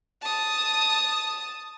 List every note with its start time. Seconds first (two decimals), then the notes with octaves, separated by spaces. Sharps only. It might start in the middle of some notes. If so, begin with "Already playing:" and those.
0.23 A5 D#6